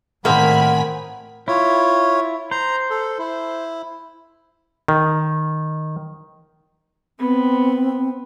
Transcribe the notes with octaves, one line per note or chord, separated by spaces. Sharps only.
A2 D#3 A#3 C4 A#4 F#5 G#5 B5
E4 F4 C#5
C5 A#5
A4
E4
D#3
B3 C4